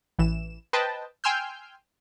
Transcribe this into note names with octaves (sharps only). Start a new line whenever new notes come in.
A1 E3 E7
B4 C5 D#5 G5 A5
G5 G#5 C6 E6 F6 G6